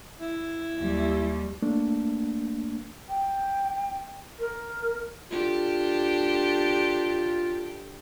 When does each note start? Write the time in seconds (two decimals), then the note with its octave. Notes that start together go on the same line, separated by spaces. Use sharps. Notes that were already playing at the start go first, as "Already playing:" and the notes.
0.20 E4
0.79 D#2 G3
1.62 A3 A#3 D4
3.09 G5
4.39 A#4
5.30 D4 F4 G4 A4